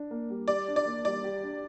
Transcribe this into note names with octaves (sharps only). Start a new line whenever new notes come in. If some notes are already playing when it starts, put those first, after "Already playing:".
Already playing: D4
A#3
G3
G4 D5
D4
D5
A#3
G3 D5
G4
D4